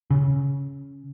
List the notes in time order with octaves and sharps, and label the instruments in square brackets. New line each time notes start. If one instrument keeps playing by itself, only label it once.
[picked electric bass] C#3